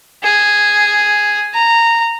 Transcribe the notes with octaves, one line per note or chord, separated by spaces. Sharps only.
G#4
A#5